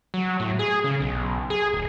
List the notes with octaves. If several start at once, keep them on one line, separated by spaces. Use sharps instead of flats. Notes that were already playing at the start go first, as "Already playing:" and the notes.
F#3
A2
G#4
C#3
B1
G#4
D1